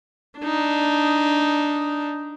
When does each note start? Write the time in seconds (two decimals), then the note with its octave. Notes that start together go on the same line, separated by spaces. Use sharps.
0.39 D4 D#4